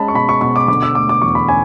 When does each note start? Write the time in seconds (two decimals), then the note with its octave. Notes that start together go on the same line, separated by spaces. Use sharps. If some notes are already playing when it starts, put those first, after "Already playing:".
Already playing: G#3 C#4 A5 B5
0.08 C#6
0.14 B2 B5
0.29 C#6
0.41 B2 C#6
0.56 D6
0.68 D3 D6
0.83 E6
0.95 A3 D6
1.09 D6
1.22 E2 C#6
1.35 B5
1.48 C#4 G#5